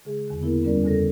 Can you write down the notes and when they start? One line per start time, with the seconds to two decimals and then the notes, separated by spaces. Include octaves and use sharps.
0.05 C#3 G#3 G#4
0.28 E2 D3
0.40 A#3 B3 E4 A#4
0.63 F#2 G3 C#4 A#4 D5
0.84 E2 C#3 A4 A#6